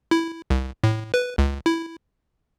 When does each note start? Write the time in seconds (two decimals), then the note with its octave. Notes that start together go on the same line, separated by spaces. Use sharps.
0.11 E4
0.50 C2
0.83 A2
1.14 B4
1.38 C#2
1.66 E4